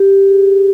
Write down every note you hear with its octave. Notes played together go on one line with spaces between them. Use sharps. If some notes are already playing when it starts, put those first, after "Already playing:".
Already playing: G4
G#4